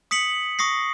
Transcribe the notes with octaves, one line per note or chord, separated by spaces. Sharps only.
D#6 B6 C#7 F#7
C#6 D#6 A#6 C7